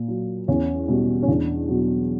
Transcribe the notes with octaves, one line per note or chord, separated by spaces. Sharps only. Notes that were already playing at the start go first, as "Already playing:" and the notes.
Already playing: A#2
F#3
E2 C#4
B2 G3
C#4
E2 D4
B2 F#3